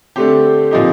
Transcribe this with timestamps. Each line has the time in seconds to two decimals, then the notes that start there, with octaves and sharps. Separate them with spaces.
0.16 D3 A3 C4 G4
0.71 A#2 F3 C4 D#4 G4